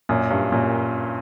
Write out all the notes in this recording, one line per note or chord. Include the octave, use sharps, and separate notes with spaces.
F#2 A#2
G2
F#2 A#2